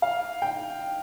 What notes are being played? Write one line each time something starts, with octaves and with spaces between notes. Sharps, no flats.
F5
G5